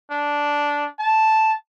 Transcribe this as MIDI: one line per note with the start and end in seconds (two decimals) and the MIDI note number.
0.11 0.85 62
0.99 1.53 81